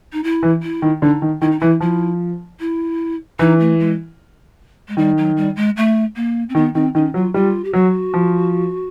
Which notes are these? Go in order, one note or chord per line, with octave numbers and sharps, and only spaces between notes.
D#4
E4
E3
E4
D#3
D3 D#4
D#3
D#3 E4
D#4
E3 E4
F3 E4
E4
E3 D#4
A3
G#3
G#3
D#3 G3
F#3
G3
G#3
A3
A#3
C4
D#3 B3
D#3 C4
D#3 C#4
F#3 F4
G3 F4
G4
F#3 F#4
F3